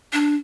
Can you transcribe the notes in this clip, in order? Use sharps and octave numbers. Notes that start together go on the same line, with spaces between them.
D4